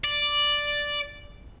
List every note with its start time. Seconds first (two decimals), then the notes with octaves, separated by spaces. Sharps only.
0.04 D5